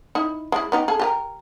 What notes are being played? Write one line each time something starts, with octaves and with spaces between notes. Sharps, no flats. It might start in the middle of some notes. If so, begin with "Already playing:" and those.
D#4 E4
G#3 E4
B3 D#4 G4
G#4 A4
G4 G#4 A#4